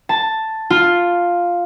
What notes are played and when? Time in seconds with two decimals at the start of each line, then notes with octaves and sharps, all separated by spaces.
0.09 A5
0.70 F4